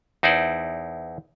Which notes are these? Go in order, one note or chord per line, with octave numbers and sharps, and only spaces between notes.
E2 D#4 E4 C5 D5